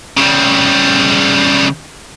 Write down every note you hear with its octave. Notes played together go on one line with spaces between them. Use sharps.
C#3 G3